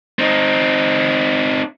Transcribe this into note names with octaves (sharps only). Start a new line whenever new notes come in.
C4 D#4